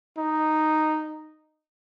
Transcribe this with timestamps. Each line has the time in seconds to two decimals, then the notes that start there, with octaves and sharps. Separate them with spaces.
0.18 D#4